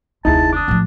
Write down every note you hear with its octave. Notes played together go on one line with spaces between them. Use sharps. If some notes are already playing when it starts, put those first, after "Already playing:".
F1 D2 D#4 E4 G#4 A5
D4 D6 D#6
A2 F3